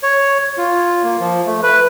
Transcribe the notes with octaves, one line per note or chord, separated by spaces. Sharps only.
C#5
F4
A#3
F3
A3
B4